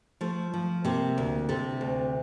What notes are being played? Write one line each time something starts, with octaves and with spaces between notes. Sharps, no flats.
F3 A3
F3
C3 A#3
D2
C3 A4
D2